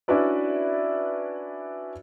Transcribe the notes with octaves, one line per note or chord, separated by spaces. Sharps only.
C#4 D4 E4 F#4 B4 D5